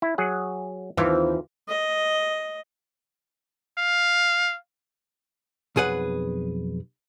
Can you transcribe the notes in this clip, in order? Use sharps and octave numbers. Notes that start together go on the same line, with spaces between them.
E4
F#3 G#4 F#5
D#2 E3 C4 F4
D#5
F5
B1 F2 G#4 B4 F#5